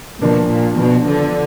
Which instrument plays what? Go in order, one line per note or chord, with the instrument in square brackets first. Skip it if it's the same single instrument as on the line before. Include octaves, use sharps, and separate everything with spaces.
[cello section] B2 [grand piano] F3 A#3 D4
[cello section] A#2
[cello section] B2 [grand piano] F3 B3 D4
[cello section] D3